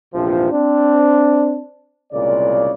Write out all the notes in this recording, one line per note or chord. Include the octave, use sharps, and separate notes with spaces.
A#1 E2 G#2 C3 F3
C4 D4
C2 A#2 C#3 G#3 D5